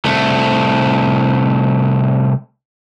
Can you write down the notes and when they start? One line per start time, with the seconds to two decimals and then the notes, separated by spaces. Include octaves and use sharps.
0.05 C2 A3